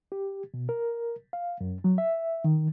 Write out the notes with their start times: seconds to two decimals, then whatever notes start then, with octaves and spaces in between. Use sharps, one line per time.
0.12 G4
0.54 B2
0.69 A#4
1.33 F5
1.61 F#2
1.84 F#3
1.98 E5
2.44 D#3